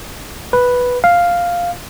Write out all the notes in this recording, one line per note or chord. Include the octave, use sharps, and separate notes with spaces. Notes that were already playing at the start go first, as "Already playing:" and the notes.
B4
F5